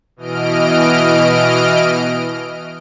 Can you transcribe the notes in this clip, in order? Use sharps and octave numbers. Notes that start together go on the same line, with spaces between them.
B2 E3 D#5 F6 D7